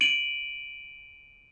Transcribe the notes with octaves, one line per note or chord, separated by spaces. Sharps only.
D7 D#7 F#7